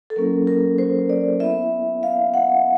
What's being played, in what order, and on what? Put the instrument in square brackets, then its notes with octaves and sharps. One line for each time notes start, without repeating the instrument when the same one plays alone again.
[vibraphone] A4
F#3 A#3 C#4 E4 A#4
A#4
C5
D5
B3 E4 E5
F5
F#5